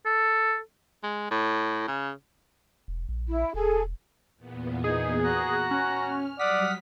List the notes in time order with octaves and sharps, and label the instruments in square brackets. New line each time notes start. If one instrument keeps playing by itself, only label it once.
[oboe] A4
[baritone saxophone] G#3
A2
C#3
[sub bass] E1
A#1
[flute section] E4
[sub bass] E1 [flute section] G#4 A4
[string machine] E2 A#2 B3
[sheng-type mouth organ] D#4 [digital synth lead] G#4
[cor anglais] F#4 [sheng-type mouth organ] A#5 F#6
[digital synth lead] C#4 [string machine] F6
[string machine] F#3 G3 [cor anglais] D5 [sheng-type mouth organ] F#5 D#6 F6 [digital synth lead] B6